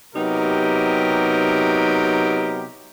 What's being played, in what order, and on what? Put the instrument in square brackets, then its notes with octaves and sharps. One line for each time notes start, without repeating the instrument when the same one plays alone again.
[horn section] C3 F#3 B3 D#4 G4 A#4